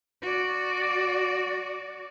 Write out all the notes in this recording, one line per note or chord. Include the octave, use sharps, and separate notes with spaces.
F#4 D5